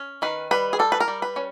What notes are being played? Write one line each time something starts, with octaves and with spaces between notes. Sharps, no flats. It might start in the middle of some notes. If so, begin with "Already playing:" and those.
Already playing: C#4
D#3 B4
G3 B4
G#4
G3 A4
B4
A#4
G3
B4
C#4